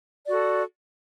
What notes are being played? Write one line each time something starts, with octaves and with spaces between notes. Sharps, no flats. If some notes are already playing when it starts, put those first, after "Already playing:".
F#4 A4 D5